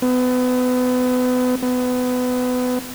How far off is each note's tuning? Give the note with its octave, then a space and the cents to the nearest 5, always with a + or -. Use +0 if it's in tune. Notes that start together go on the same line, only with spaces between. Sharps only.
B3 +30
B3 +25